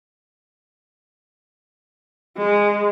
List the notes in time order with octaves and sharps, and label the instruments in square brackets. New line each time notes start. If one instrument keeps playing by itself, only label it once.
[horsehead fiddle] G#3